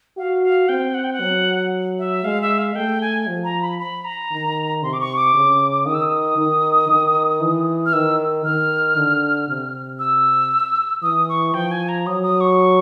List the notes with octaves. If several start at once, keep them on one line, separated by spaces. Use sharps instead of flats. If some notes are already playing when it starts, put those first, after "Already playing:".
F#4 F5
F5
C4 G5
F#5
G5
F#5
F#3
E5
G#3 F5
E5
F5
A3 G5
G#5
F3
A#5
B5
B5
A#5
D#3
C3 C6
D6
C#6
D6
C#3
D#3 D#6
E6
D#6
D#3
D#3
E3
F6
D#3 E6
D#3 F6
D3
C3
E6
E3 D#6
C#6
F3 G5
G#5
A#5
F#3 D#6
D#6
C#6